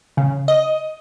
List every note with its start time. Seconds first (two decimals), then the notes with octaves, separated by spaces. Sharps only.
0.17 C#3
0.48 D#5